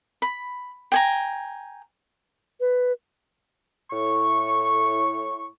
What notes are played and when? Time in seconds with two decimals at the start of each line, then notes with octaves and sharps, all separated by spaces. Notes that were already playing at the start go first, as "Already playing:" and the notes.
0.22 B5
0.92 G5 G#5 A#5
2.60 B4
3.91 A2 C#6